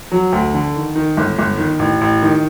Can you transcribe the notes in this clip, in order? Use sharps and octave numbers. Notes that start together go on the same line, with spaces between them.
F#3
D2
D3
D#3
D#3
G1
G1
D#3
A1
A1
D#3